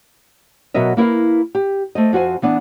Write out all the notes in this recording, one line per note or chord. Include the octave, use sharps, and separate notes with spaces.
B2 F#3 A#4 D#5 E5
A#3 E4 A#4 B4 F5
G4
A3 C5 D#5
F2 F#4 C5 G#5
E3 B3 D4